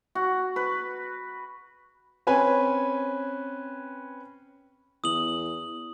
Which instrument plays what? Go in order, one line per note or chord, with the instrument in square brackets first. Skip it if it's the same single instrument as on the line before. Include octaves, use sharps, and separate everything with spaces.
[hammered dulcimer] F#4
B4
[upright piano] C4 C#4 B4 G#5
[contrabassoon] E2 [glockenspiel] D#6 F#7